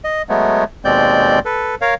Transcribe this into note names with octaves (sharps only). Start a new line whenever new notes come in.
D#5
F#3 G#3 A3 B3
D#2 B2 G#3 C4 D5 G6
A4 B4
A#4 C#5 F5